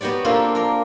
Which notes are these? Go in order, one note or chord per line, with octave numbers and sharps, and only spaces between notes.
B3 F#4 G4 C#5 D5
A#3 C4 D4 F4 G4 A4
F4 A#4